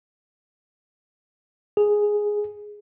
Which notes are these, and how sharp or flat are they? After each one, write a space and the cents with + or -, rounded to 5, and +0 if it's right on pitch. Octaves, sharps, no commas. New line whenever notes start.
G#4 +0